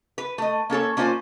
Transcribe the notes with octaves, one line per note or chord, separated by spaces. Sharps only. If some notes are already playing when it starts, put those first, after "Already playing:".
B4
A3 D#5
A#3 C#4 A4 C#5
A#3 C#4 F4 C5 D5 G#5